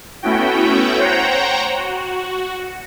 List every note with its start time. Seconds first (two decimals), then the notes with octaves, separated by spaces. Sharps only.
0.22 A3 B3 C#4 E4 F#4 G5
0.99 C5 C#5 F#5 G5 A#5
1.77 F#4